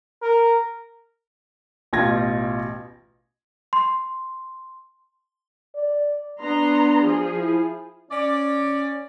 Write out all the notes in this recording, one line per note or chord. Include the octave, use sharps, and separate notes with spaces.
A#4
A1 B2 F4 G5 G#6 A#6
C6
D5
B3 D4 A#5 C6
F3 G#4
E4
C#4 D5